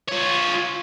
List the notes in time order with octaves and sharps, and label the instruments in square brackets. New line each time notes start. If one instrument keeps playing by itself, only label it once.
[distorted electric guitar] F4 C#5